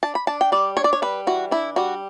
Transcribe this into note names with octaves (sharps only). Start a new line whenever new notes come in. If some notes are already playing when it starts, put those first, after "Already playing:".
D4 A5
B5
D4 A5
G5
G3 D5
D4 C#5
D5
C#5
G3 B4
E3 F#4
D4 E4
G3 F#4